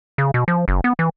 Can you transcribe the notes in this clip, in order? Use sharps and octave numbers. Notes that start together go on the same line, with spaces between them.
C#3
B2
F3
F#1
B3
E3